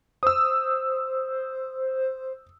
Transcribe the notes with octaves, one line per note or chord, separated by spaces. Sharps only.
C5 D#6 E6